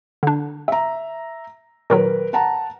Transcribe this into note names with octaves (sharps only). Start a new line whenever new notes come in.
D3 D4
E5 A#5
A#2 D#3 F#3 A#4 B4
F#5 A5 A#5